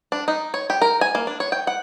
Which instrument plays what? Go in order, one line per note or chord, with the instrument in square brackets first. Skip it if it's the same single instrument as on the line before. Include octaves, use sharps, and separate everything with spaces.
[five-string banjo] D4
D#4
C#5
G4
A#4
G#5
A#3
D4
C#5
G5
F#5